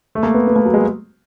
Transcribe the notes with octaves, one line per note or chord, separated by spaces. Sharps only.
A3
A#3
B3
B3
A#3
F#3
G#3